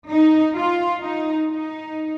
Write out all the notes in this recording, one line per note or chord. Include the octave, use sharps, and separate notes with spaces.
D#4
F4
D#4
D#4